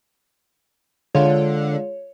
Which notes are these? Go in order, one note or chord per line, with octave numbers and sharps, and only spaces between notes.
D3 G#3 F4 C#5